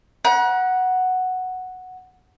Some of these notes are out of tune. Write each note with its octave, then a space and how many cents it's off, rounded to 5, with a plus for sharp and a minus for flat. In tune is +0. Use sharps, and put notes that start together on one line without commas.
F#5 +0 A#5 +45